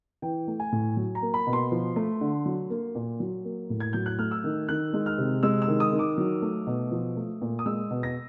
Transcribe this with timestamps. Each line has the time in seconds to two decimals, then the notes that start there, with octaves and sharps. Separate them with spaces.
0.22 E3 G5
0.48 A3
0.60 G#5
0.72 A2
0.97 F#3
1.15 A#5
1.22 A#3
1.34 B5
1.47 B2
1.53 C6
1.72 F3
1.96 A3
2.21 D3
2.46 F#3
2.70 A#3
2.95 A#2
3.20 F#3
3.45 A#3
3.70 A2
3.80 G#6
3.93 F#3 G6
4.06 F#6
4.19 A3 F6
4.31 E6
4.44 D#3
4.69 D#3 F#6
4.94 G#3
5.06 F6
5.18 C3
5.43 G#3 E6
5.62 E6
5.68 D#3
5.80 D#6
5.93 D#3
5.99 D6
6.18 F#3
6.42 A3
6.67 B2
6.92 F3
7.16 A3
7.42 A#2
7.59 D#6
7.66 G#3 E6
7.91 B2
8.03 A#6